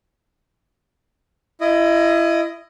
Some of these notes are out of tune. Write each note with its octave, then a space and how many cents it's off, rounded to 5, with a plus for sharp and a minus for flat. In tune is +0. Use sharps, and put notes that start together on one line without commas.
E4 +30 D#5 +0